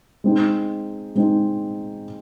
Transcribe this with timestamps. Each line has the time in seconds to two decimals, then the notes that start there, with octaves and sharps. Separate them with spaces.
0.24 G#3 C4 D#4
1.15 G#3 C4 D#4